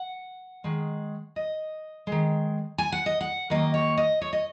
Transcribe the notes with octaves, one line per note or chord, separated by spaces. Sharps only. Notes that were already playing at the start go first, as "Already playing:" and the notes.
Already playing: F#5
D#3 G#3
D#5
D#3 G#3
G#5
F#5
D#5
F#5
D#3 F#3 A#3 D#5
C#5
D#5
C#5
D#5